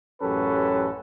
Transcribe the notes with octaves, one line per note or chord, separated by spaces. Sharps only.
A1 F#2 C#4 G4 A4 B4